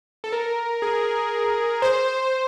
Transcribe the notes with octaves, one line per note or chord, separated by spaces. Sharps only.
A4
A#4
G#4
C5
C5